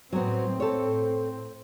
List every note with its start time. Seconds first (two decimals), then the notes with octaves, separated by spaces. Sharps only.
0.13 A2 F#3 B3 C4
0.60 A4 C#5